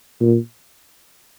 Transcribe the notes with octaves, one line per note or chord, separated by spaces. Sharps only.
A#2